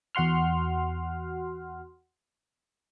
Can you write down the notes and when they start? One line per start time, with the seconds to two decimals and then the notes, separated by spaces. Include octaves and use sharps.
0.15 E2 F#4 F#5 C6 F6